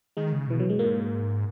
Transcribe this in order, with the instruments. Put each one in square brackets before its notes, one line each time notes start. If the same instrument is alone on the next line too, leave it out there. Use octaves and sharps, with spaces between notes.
[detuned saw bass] D#3 [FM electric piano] G#3
[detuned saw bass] C#3
[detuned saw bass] B2 [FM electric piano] E3
[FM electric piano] F#3
G#3
[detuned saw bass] G#2 [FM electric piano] A#3